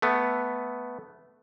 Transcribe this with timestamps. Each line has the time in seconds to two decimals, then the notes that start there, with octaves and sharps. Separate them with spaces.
0.02 A3 B3